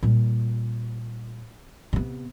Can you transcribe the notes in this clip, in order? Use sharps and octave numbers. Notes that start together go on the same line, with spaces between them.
A#2 G3
C3 B3